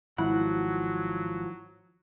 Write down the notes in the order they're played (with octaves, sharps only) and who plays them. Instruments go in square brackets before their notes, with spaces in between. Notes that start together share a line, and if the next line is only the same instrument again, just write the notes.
[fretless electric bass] G#1 [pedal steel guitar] F3 F#4 F#5 [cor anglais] F#3 [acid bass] E4